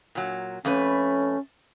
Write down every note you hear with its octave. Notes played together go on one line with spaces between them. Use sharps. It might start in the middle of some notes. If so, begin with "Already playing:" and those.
A#2 F#3
F2 A3 C#4 B4